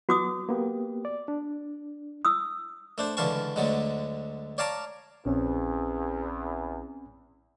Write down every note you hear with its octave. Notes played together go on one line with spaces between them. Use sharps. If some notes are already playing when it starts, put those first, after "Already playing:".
F#3 B3 F#4 D6 D#6
A#3 B3 G4
D5
D4
D#6 E6
A3 D4 C5
C#2 D3 E3 F5 A5 C#6
D2 D3 F#3 G#3
C#5 D5 F5 A5 A#5 D6
A#1 E2 C4 C#4